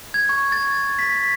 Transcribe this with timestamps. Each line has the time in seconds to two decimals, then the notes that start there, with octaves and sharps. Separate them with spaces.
0.14 G#6
0.29 C#6
0.52 A6
0.99 B6